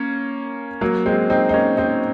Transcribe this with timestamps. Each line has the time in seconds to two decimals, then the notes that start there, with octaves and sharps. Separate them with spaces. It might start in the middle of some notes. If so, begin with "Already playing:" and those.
Already playing: A#3 C#4
0.81 F#3 A#3
1.06 G#3 C4
1.30 C4 D#4
1.49 D#4
1.54 A#3 C#4
1.77 C4 D#4